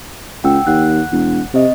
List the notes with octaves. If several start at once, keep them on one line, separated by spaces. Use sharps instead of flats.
C#2 F#5 G5 E6
D#2 F#5 F#6
E1
C3 C4 D#5